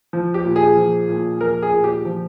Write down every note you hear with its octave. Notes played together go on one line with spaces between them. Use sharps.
F3
G4
A#2
G#4
F3
A#2
F3 A#4
G#4
A#2
G4
F3